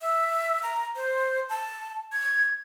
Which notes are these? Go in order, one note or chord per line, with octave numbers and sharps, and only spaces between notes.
E5
A#5
C5
A5
G#6